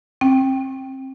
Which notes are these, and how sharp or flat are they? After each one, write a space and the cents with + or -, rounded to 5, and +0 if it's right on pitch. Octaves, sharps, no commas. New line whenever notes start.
C4 +30 G5 +0